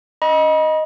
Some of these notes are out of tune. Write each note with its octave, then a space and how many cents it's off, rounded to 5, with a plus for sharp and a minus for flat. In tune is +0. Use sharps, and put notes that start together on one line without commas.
D#5 +5 B5 -40